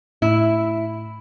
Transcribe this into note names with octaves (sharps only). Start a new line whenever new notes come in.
A2 E4